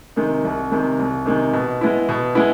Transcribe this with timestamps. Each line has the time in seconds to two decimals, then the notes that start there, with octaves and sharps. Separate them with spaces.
0.16 C3 D#3 G#3
0.45 C2
0.72 C3 D#3 G#3
0.99 C2
1.26 C3 D#3 G#3
1.53 B2
1.81 G#3 B3 E4
2.09 B2
2.35 G#3 B3 E4